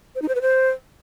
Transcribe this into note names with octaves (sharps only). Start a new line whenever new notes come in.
C5
D#4
C5
B4
C5